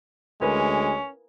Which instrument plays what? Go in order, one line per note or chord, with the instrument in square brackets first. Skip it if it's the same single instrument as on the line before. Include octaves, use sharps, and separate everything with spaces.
[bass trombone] D2 [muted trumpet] G#3 [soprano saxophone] C#4 [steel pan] A#4 B4 G#5